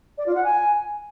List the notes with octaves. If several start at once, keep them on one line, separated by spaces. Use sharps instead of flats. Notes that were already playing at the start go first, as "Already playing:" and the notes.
D5
F4
F#5
G#5